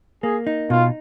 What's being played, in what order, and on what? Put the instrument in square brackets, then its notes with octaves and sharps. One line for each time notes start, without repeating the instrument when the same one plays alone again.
[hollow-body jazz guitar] A#3 [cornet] G#4
[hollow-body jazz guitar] D#4
[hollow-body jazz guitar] B2 [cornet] F4